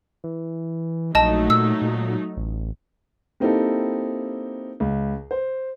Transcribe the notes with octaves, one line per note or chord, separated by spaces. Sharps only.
E3
A#1 F#3 A3 D#4 D#5 A5
A#2 E6
A#2
A1
A#3 C4 D#4 E4 G4 A4
C#2
C5